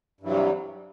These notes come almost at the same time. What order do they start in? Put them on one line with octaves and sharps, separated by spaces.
G2 E3 F#3 C3 G3